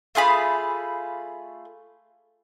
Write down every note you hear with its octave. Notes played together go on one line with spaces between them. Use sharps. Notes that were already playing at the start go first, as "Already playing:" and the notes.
A3 F4 G#4 B5